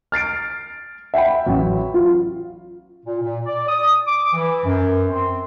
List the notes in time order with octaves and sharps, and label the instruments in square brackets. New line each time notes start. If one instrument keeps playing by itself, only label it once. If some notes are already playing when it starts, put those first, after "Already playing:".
[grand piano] F6 A6 C7 D7
E5 F#5 G5 B5
A1 F#3
F4
[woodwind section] A#2
A#2
D5
D#6
D6
E3
F#2
C4